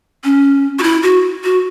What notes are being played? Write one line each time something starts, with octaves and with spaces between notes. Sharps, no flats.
C#4
F#4
E4
F#4
F#4